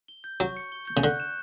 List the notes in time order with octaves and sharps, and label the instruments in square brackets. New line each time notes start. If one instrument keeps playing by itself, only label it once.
[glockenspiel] G7
G6
[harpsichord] F#3 [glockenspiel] C#6
[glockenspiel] C#7
G7
G6
[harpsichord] C#3
[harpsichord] D3 [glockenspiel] F#6
[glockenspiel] E7